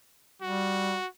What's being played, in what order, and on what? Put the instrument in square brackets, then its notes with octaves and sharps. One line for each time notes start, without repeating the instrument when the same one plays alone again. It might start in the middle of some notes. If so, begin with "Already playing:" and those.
[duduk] G3 [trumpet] F#4